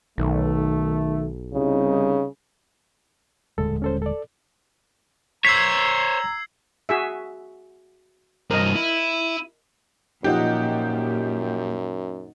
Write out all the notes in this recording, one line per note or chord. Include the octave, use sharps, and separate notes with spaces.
B1 D#3 A3
C2 C#3 D#4
D#1 C#2 A2 D3 G#3 A4
C#4 A4 C5
A4 D5
C5 C#5 A#5 E6 G#6 B6 C7
F#4 G#4 E5
G2 C4 A#4 D#5 D#7
E4
F#2 A#2 F3 D#4 G4 D#5 F#5